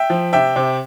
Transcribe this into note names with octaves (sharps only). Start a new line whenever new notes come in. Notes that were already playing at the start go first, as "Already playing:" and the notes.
Already playing: E5 G5
F3
C3 E5 G5
C3